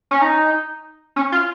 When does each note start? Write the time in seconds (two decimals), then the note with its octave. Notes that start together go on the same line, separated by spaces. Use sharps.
0.11 C#4
0.22 D#4
1.16 C#4
1.32 F4